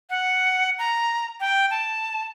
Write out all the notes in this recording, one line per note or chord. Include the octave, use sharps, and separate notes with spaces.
F#5
A#5
G5
A5